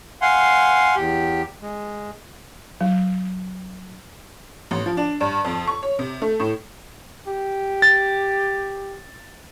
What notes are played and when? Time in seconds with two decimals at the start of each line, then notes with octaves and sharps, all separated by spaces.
0.22 F5 F#5 G#5 C6
0.96 E2 G4
1.62 G#3
2.81 F#3
4.71 A1
4.86 F3
4.97 D4
5.21 G2
5.45 F2
5.67 C#6
5.83 C#5
5.99 C3
6.22 A3
6.40 A2
7.27 G4
7.82 A6